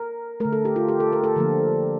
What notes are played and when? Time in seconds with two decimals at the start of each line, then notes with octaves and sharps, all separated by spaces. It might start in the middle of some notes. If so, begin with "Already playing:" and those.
Already playing: A#4
0.40 A3 A#4
0.45 D3
0.52 A4
0.65 G4
0.76 F4
0.88 G4
1.00 A4
1.13 A#4
1.24 A4
1.36 D3 F3 A#3